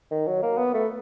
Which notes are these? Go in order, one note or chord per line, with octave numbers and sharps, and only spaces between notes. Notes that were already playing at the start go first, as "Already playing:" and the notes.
D#3
F#3
A#3
B3
A3